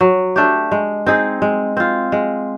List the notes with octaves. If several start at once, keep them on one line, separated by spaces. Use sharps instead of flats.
F#3
A3 D4 G4
G#3
C4 D#4 G#4
G#3
C4 F4
G#3